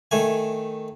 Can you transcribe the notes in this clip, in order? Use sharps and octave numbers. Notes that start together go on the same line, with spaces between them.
D#3 A3 G#5